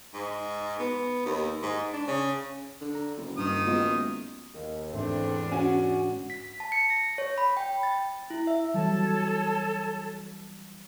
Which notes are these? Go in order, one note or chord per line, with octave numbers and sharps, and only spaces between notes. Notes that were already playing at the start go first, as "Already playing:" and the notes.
G#2
B3
D#2
G#2
D4
C#3
D3
A#5
F#1
G2 D#3 D#6
G#3 B3 F4
D#2
E2 G#2 D3 A3 C4 D4
C#4 F#4
B6
A5
C#7
A#6
C#5
B5
G5
A6
E4
E5
E3 F#3 G3 A4 C#5 A5